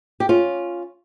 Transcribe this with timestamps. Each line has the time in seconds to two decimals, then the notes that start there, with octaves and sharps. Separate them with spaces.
0.20 G4
0.29 C#4 F4